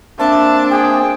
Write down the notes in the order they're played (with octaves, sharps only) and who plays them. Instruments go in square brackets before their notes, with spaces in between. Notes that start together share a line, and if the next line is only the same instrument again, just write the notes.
[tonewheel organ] A#3 C4 C5 [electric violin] D4 [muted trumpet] E5 [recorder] A5
[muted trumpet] G#4 [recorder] G5